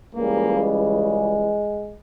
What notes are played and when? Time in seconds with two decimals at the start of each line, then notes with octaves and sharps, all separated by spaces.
0.14 C#2 C#3 E3 G3 A#3
0.57 G#3